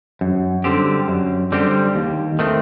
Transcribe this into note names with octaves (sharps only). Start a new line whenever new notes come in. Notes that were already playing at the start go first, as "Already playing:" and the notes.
F#2
D3 G3 C4 G4
F#2
D3 G3 C4 G4
D#2
D#3 A3 C4